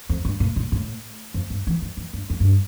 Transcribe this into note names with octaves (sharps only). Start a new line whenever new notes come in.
F2
G2
A#2
A#2
A2
F2
G2
E3
F3
E3
G2
F2
G2